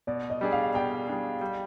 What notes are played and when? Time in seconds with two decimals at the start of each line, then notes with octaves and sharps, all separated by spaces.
0.07 B2 D5
0.30 D#5
0.41 G3 D4 G#4
0.52 F5
0.74 B2 G5
1.08 G3 D4 G#4
1.41 G3